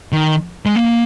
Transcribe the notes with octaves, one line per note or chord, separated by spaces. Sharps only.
D#3
G#3
A#3